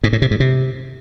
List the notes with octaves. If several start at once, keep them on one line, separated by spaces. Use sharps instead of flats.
G#2
A2
C3
G#2
C3